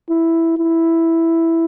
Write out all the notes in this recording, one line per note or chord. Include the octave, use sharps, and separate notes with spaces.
E4
E4